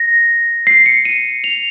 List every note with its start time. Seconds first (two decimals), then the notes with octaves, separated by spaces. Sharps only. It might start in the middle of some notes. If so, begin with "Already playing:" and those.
Already playing: A#6
0.67 C7
0.86 C#7
1.05 D#7
1.25 D#7
1.44 F7